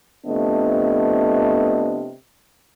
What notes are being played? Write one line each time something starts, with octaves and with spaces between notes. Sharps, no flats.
C3 F3 A3 B3 D4 D#5